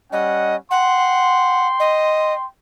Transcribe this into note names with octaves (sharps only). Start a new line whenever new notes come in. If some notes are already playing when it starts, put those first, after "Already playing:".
G3 C#4 D#5 F#5
F#5 G5 C6
D#5